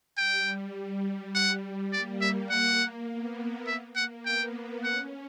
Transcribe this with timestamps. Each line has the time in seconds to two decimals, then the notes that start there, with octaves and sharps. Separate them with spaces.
0.18 G3 G5
1.35 F#5
1.93 A#3 D5
2.21 E5
2.50 F#5
3.09 B3
3.38 A#3
3.67 E5
3.95 A#3 F#5
4.24 B3 G5
4.83 C#4 F#5